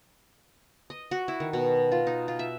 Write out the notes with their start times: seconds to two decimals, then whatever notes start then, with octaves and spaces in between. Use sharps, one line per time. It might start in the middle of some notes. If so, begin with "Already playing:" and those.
0.90 D#5
1.11 F#4
1.28 E4
1.40 D#3
1.53 B2
1.92 F4
2.07 D#4
2.28 F4
2.39 E5